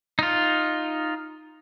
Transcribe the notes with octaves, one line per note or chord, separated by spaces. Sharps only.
D#4 F4